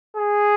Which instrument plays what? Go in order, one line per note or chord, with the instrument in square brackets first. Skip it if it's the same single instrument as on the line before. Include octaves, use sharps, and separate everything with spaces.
[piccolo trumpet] G#4